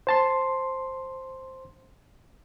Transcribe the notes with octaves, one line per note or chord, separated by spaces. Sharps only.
C5 A5 C6